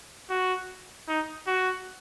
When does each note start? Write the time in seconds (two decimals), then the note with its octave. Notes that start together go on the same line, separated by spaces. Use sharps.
0.30 F#4
1.08 D#4
1.47 F#4